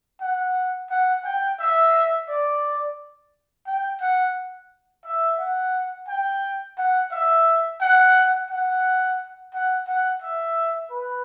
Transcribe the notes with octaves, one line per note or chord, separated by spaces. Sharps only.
F#5
F#5
G5
E5
D5
G5
F#5
E5
F#5
G5
F#5
E5
F#5
F#5
F#5
F#5
E5
B4